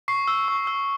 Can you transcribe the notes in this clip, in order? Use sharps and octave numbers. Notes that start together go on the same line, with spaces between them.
C#6 C7
E6
C#6
E6